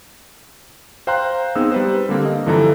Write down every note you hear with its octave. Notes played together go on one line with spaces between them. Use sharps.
C5 F5 G5 A#5 C6 F#6
B3 C4 D#4 G#4 E6
G3 B4 C5
D3 G3 A#3 C4
D#5 F5
G2 D3 E3 F3 A4 A#5